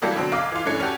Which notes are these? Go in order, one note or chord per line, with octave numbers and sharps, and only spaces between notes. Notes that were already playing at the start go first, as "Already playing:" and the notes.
E3 F#3 G3 A#3 G4 A4
B2 D3 F#3 C4
B1 F5 D6
E3 F4
G2 E3 A3 C#4
C#4 F#4 G4 A4